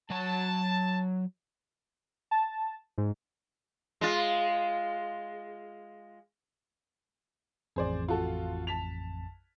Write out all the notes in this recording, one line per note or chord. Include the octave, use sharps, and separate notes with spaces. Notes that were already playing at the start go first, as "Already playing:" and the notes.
F#3 C#5 A5
A5
G#2
G#3 F4
A1 F2 G#4 C5 D5
F4 F#4 A4
A5 B6 F7